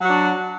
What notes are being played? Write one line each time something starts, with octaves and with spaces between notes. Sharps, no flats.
F#3 D4 F#4